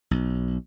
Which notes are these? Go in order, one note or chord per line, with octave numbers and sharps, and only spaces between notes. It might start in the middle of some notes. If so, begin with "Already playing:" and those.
B1